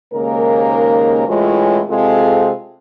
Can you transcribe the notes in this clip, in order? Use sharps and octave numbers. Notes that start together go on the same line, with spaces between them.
D#2 G#2 C#3 A#3 A#4
A2 E3 G#3 C#4 F4
C3 G#3 C4 F4 G#4 A4